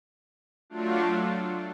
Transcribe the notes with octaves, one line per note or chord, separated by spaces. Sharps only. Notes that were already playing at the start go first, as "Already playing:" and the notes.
F#3 A3 D4 F4